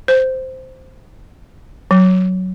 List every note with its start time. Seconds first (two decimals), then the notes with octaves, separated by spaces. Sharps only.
0.08 C5
1.91 F#3